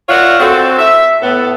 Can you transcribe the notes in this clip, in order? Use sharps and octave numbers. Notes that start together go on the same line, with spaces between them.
F4 A#4 C#5 D5 E5 F#5
C4 F#4 A4
E5
A2 B3 A4